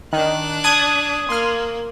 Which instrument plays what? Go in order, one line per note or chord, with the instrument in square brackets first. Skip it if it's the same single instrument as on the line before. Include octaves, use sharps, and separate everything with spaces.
[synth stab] D#3 [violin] D4 F#6
[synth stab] A5 D7 [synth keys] D#6 G#6
[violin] A#3 [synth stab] C6 F6